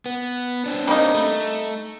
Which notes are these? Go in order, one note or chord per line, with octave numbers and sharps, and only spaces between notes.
B3
C4 D4
G3 A#3 D#4
A3